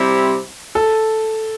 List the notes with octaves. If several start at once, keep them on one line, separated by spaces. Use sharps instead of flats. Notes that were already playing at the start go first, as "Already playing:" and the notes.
Already playing: C3 G3 C4 E4
A4